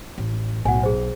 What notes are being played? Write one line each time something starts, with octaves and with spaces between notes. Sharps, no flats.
A1
B1 A2 F#5 G#5
G#4 C5